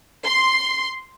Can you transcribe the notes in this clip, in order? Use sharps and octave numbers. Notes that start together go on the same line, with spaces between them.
C6